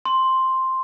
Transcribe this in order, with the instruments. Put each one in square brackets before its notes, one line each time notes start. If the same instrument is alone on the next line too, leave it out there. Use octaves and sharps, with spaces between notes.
[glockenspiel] C6